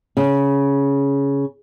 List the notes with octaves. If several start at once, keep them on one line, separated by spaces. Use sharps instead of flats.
C#3